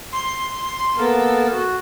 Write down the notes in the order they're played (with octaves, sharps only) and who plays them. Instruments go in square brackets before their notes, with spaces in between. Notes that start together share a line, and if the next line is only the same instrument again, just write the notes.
[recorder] C6
[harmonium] A#3 B3 A#4 [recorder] A4
[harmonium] F#4